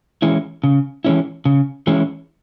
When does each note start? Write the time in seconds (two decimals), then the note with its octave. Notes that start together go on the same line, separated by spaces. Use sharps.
0.22 E3 G#3 C#4 E4
0.64 C#3
1.05 E3 G#3 C#4 E4
1.45 C#3
1.87 E3 G#3 C#4 E4